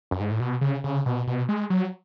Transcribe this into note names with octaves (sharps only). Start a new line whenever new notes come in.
F#2
G#2
A2
B2
C#3
C#3
B2
B2
G#3
F#3